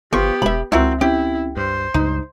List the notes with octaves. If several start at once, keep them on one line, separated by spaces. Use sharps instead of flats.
G1 F3 B3 G4 C#6
E1 E5 B5
C#2 C4 E4 F#4 A#4
C4 C#4 E4 G4
G2 C5
C#2 G2 D#4